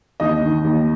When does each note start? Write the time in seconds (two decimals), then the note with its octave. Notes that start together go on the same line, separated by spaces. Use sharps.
0.20 D#2 D#4 D#5
0.42 D#3
0.64 D#2